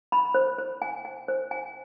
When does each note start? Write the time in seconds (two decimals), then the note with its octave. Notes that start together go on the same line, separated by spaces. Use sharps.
0.12 B5
0.34 C5
0.58 C5
0.82 G#5
1.05 G#5
1.28 C5
1.51 G#5